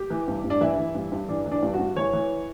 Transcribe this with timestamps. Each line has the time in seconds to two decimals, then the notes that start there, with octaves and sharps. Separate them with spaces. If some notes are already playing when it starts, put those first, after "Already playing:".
Already playing: G4
0.10 E3
0.28 G2
0.44 G2
0.50 D4
0.61 E3 E4
0.78 E3
0.95 G2
1.12 G2
1.29 E3 D4
1.46 E3
1.51 D4
1.63 G2
1.74 F#4
1.80 G2
1.96 E3 C#5
2.13 E3